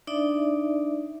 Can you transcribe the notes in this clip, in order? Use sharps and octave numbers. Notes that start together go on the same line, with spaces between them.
D4 D#4 D5 E5